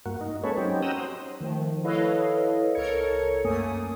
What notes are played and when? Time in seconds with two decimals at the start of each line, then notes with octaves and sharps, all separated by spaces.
0.06 G2 A#3 F#4
0.21 D#4
0.44 G#3 A#3 C#4 A4 B4 C#5
0.58 F#3 C4 C#4 D#4 G4
0.82 F#5 G5 A#5 D#6 E6
0.96 C5
1.40 D#3 F3 A3
1.84 E4 A4 B4 C#5 D#5 F5
2.75 C2 A4 A#4 C#5 G#6 C#7
3.44 F#2 A3 A#3 G#5 D#6